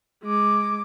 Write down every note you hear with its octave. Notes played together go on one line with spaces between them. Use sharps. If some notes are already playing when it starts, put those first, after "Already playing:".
G#3 D6